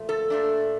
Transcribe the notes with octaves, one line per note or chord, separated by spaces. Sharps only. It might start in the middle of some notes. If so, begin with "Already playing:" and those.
Already playing: A#2 F3 A3
A4
A#2 A3 D4